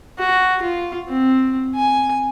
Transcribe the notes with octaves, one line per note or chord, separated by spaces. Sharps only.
F#4
F4
C4
G#5